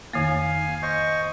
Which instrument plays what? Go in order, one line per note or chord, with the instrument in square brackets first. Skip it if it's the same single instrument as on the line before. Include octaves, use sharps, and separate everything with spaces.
[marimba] F2 D#3 A#3 [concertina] F5 G#5
[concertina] C5 D#5 C#6